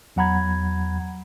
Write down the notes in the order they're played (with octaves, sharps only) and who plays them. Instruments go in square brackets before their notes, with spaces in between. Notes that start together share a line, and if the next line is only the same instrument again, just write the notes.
[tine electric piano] E2 F#3 F#5 A#5 B5 G#6